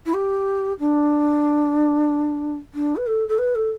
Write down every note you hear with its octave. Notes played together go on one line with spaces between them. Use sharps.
E4
G4
D4
D4
B4
A4
A4
B4
A4